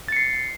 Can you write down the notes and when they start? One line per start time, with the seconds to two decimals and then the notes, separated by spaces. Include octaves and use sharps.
0.08 A6
0.12 C#7
0.16 C7